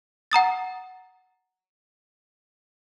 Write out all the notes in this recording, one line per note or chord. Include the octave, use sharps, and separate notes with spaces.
F#5 A#5 D#6 A6